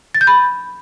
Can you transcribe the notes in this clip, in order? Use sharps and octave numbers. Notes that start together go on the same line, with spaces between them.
A6
G6
B5